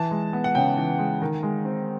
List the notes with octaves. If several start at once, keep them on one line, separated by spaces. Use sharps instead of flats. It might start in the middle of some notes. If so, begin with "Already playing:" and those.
Already playing: E3 A5
G#3
B3
F#5
C#3 G5
E3
G#3
D#3
G#3
C4